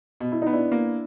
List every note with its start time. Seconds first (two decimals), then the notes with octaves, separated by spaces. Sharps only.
0.20 B2
0.32 E4
0.42 B3 D#4
0.53 D4 E4
0.72 A#3